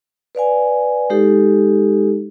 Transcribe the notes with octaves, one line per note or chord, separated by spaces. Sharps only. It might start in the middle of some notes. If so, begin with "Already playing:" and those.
B4 D5 F5 G#5
G#3 D#4 G4 A4